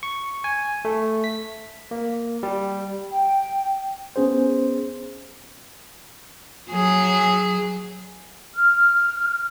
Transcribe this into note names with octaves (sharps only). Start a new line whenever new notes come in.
C#6
G#5
A3
B6
A#3
G3
G5
B3 C#4 G#4 C5
F#3 G#4
F6